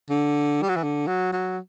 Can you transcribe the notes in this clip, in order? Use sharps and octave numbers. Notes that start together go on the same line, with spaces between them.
D3
G3
F#3
E3
D3
F#3
F#3